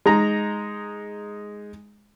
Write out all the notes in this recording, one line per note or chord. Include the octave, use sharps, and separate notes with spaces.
G#3 D#4 A#5